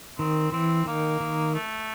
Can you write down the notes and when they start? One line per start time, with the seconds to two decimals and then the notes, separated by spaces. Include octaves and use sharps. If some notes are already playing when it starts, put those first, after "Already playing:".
0.19 D#3 C4
0.52 E3 C4
0.86 D#3 A#3
1.20 D#3
1.54 A3